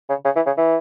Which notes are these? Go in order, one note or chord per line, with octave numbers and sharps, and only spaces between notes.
C#3
C#3
E3
C#3
E3